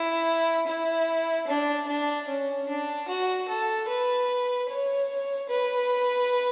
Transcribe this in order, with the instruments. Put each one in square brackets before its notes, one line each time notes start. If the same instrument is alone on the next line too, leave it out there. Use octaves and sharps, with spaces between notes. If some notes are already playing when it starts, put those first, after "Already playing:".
Already playing: [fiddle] E4
E4
D4
D4
C#4
D4
F#4
A4
B4
C#5
B4